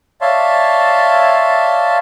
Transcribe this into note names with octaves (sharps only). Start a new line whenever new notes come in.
C#5 D5 E5 F5 A5 C6